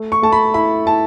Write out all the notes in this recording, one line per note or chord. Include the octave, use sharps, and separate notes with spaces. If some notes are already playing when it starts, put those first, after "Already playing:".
Already playing: A3
C#6
A3 A5
B5
E4 B5
E4 A5